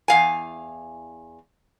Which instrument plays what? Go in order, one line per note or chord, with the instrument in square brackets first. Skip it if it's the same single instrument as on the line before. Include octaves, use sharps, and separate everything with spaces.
[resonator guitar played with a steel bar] E2 F5 G#5